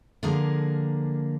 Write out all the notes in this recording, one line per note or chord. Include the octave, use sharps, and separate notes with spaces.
D3 F3 A#3 G#4 A#4